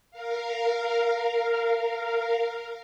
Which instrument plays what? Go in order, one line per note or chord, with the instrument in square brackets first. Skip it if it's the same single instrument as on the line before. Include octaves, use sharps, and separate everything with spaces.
[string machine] A#4 F5